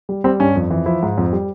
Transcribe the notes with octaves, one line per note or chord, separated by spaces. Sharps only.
G3
G3 C4
G2 C#4
F2
E3
F3 E4
G#2
F2
G3